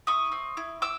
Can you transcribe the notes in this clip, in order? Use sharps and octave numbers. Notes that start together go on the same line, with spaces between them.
E4 C#6 D#6
C4
E4
E4 D6 E6